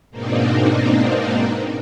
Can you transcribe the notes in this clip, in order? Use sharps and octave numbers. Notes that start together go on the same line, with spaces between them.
G#2 B2 A#3 C4 D4 D#4